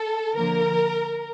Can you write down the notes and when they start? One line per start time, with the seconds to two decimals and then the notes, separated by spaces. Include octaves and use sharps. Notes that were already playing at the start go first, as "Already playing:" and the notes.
Already playing: A4
0.35 D3 F3 A#3 A#4